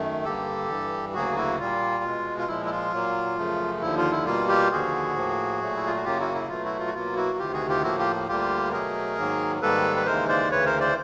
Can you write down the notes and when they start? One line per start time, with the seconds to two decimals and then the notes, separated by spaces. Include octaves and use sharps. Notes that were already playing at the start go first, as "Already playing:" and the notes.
Already playing: F#2 D#3 A3
0.25 G2 D3 G3 A#3 G4 A4
0.69 G2 E3 G3
1.14 D2 C#3 F#3 A#3 F#4 G#4
1.36 E4 F#4
1.59 A#2 G3 A#3 F4
2.04 B2 G#3
2.38 F4
2.48 A#2 F3 G#3 E4
2.66 E4
2.71 F4
2.93 A#2 F#3 A#3
3.37 F#2 C#3 F3 A3
3.81 D#2 D3 F3 E4
3.97 F4
4.11 E4
4.26 B2 G3 A#3 F4
4.49 F4 G4
4.72 D#2 D3 F3 F#4 G#4
5.15 A2 F3 A#3
5.61 A#2 F#3 A3
5.76 E4
5.86 F4
5.96 F#4
6.04 F#2 C#3 F#3 A#3 F4 G4
6.20 E4 F#4
6.34 E4
6.49 B2 F#3 A3 F4
6.64 E4 F#4
6.79 F4
6.87 F#4
6.94 B2 F#3 A#3 F4
7.16 E4 F#4
7.38 D2 C3 D#3 F4 G4
7.53 F#4 G#4
7.69 F4 G4
7.83 A2 F3 A#3 E4 F#4
7.99 F4 G4
8.28 D2 D3 G3 A#3 F4 G4
8.72 B2 F#3 A3 G#4 A#4
9.18 G#2 D#3 F#3 A#3
9.62 G#2 D#3 G3 A#3 A4 B4
9.96 B4
10.06 D#2 C#3 E3 G#3 A#4 C5
10.29 C5 D5
10.51 D2 C#3 E3 B4 C#5
10.66 A#4 C5
10.80 C5 D5